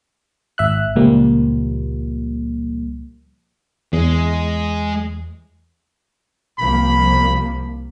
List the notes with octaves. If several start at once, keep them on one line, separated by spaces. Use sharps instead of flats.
G#1 E5 F#6
C#2 A#2 F3 G3 A#3
E2 G#3
C2 F3 A#3 B5